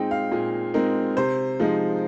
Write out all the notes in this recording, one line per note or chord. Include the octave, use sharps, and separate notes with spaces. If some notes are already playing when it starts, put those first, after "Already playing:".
Already playing: A#2 G#3 C4 D#4 G5
F5
A#2 G#4
G#3 C4 D#4 A#4
C3 C5
F3 G#3 D#4